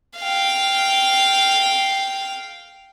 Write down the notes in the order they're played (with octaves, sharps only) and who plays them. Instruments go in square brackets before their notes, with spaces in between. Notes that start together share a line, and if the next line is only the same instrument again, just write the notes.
[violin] F5 G5